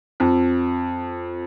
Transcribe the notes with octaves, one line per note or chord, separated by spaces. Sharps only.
F2